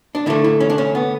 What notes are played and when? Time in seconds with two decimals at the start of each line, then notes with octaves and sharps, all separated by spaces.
0.15 D4
0.26 D3 A3 E4
0.44 E4
0.60 C#4
0.70 D4
0.78 C#4
0.95 B3